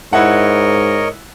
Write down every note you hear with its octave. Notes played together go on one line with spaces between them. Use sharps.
G#2 E4 A#4 C#5 D#5 F#5